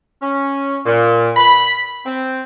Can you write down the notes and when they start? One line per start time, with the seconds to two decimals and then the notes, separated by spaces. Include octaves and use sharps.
0.22 C#4
0.86 A#2
1.37 B5
2.06 C4